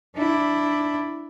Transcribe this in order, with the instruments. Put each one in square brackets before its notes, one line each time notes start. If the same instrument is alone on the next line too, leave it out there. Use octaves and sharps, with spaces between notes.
[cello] D4 E4